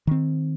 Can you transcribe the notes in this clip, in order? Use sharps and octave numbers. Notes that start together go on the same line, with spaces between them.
D#3 C4